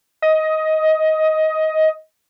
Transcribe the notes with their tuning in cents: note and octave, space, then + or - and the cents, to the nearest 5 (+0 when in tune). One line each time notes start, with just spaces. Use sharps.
D#5 +15